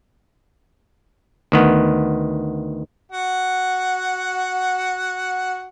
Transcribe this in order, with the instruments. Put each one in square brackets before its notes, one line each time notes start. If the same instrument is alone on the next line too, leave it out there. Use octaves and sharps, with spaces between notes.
[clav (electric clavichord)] D2 D#3 B3
[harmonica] F#4 F#5